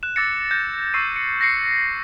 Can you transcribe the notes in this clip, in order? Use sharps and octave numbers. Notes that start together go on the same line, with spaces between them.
F#6 E7
D6 E6 A6 A#6 C#7
F#6 G6 A#6
C#6 E6 C7 D#7
C#7
A#6 C7 C#7